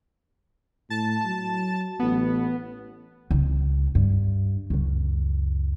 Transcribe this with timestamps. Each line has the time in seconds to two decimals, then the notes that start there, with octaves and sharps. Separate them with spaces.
0.90 A2 A5
1.25 F#3
1.99 A1 B3
3.31 C#2 C4
3.95 G2
4.70 C#2 F#2